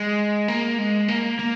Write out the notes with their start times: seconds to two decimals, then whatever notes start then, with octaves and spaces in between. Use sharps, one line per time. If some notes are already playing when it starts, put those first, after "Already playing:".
Already playing: G#3
0.48 A#3
0.78 G#3
1.08 A#3
1.39 A#3